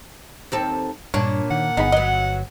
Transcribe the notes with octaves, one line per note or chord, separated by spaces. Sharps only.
D#2 C4 A4
G2 A#2 D4 C#5
D#3 F#5
G1 B3 D#4 G#4 B5
F#3 B3 D#5